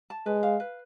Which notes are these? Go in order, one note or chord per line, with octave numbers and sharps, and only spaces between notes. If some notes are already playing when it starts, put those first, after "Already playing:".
A5
G#3 B4
F5
B4